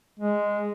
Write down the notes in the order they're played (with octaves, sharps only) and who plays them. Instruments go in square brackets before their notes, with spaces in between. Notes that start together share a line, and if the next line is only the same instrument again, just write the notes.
[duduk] G#3